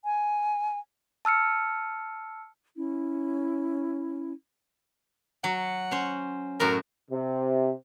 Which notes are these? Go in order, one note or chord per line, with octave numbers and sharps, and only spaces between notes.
G#5
A5 E6 F6 C#7
C#4 E4
F#3 F#5
C#4 C5
F#2 A2 F#4 A#4
C3